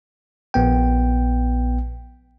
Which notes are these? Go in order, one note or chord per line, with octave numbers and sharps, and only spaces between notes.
A#1 B3 G5